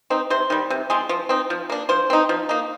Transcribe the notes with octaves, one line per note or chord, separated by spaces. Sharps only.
C4 D#4
C3 C5
D#3 G3
C3
F3 G#3 C4
F3
C4 D#4
F3
A#3 D4
F3 C5
C4 D#4
F3
A#3 D#4